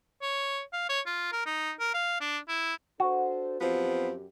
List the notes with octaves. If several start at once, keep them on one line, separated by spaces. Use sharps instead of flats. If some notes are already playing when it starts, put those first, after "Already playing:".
C#5
F5
C#5
F4
A#4
D#4
A#4
F5
D4
E4
D4 F#4 A4 C5
F#2 F3 B3 C4 G4